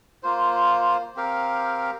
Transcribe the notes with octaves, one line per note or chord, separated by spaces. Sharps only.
A#3 F4 C5
C4 G4 A#4 F5